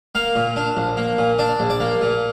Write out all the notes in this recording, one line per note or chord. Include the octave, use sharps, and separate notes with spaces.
A#3 F5
A#2
D4
A#1
A#3
A#2
D4 D5
A#1
D5
A#3
A#2